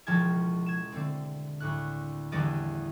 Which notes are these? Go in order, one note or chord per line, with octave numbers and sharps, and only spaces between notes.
E1 C#2 F3 G5 A5 G#6
G#6 E7
D3 A3 C4
D2 A2 F#6
A1 E2 D3 G3 D5 D#5